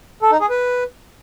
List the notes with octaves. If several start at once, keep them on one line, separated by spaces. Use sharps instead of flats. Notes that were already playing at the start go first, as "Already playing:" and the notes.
A4
D#4
G#4
B4